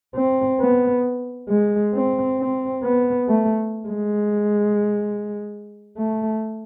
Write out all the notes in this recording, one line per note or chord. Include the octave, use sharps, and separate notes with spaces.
C4
B3
G#3
C4
C4
B3
A3
G#3
A3